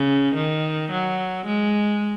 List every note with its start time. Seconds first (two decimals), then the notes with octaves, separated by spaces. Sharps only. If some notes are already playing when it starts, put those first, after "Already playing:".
Already playing: C#3
0.35 D#3
0.92 F#3
1.47 G#3